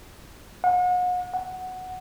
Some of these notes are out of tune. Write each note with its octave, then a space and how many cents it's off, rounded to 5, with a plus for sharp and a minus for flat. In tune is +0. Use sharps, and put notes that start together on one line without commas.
F#5 -40
F#5 +0